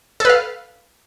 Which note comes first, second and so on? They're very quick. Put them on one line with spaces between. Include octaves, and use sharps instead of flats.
A4 B4 F5